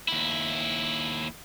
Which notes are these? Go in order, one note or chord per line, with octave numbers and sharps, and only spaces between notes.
D#2 E4